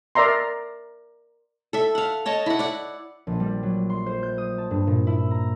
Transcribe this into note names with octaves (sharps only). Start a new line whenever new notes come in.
A#4 D5 E5 A#5 C6
A4 E5
F5 F#5
C#5 D#5 A5
E4 F#5
D5 F#5
A#1
G3
F#3
C6
C5
G6
D#6
A5
G2
A#2
E4
A#5